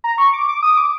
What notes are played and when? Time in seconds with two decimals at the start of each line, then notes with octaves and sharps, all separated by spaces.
0.04 A#5
0.18 C#6
0.33 D6
0.48 D6
0.62 D#6
0.77 D6